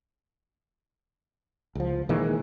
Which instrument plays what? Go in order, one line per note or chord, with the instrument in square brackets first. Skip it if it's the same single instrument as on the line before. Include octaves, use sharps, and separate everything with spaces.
[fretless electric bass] C#2 F3
A#2 D#3 E3 G#3